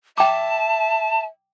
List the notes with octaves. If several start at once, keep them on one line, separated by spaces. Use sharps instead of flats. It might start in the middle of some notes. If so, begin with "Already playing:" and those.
E5 G5 A5 D6